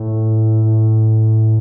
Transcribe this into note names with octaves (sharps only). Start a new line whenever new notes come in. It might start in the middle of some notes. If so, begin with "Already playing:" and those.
Already playing: A2
A2